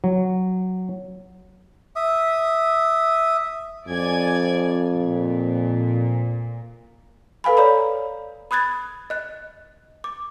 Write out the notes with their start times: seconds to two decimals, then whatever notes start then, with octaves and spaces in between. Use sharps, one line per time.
0.04 F#3
1.96 E5 D#6
3.88 F2 D5 G#5 G#6
4.95 A#2
7.44 A4 B4 F5 G#5 B5
7.57 C#5 D5 A#5 B5
8.51 B5 D#6 F#6 G#6 A6
9.10 D#5 F#6
10.04 D6